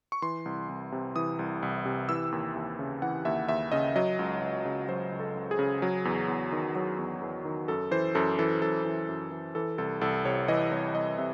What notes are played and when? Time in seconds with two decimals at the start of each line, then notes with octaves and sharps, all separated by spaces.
0.12 C#6
0.22 E3 C6
0.45 C2
0.69 C2
0.92 C3
1.16 E3 D#6
1.39 C2
1.63 C2
1.85 C3
2.09 E3 E6
2.32 D#2
2.55 D#2
2.79 C#3
3.02 E3 F#5
3.25 D#2 E5
3.48 D#2 E5
3.72 C#3 D#5
3.96 F#3 D#5
4.19 C#2
4.42 C#2
4.65 C#3
4.89 F#3 C5
5.12 C#2
5.20 A4
5.35 C#2
5.51 G#4
5.59 C#3
5.82 F#3
6.05 E2
6.28 E2
6.52 D#3
6.76 F#3
6.99 E2
7.21 E2
7.45 D#3
7.68 F#2 A4
7.91 E3 C5
8.15 F#2 A4
8.39 E3 A4
8.61 F#2 A4
8.85 E3
9.09 F#2
9.32 E3
9.55 E3 A4
9.78 C2 A4
10.01 C2 A4
10.25 C3 C#5
10.48 E3 D#5
10.71 C2 C#5
10.95 C2 D#5
11.18 C3 E5